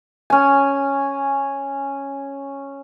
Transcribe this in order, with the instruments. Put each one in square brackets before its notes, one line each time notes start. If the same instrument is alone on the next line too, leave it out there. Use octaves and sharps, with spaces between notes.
[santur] C#4 G#5